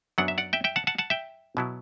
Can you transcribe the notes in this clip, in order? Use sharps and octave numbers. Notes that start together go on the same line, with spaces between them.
F#2 F#3 B3 D4 F#5
E5
D5 F#5
E5 G5
E5 G5
F#5 A5
F#5 A5
F#5 A5
E5 G5
B2 F#3 B3 E4